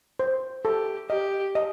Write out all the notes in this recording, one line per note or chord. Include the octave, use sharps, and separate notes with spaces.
C5
G4 A4
G4 D#5
D#5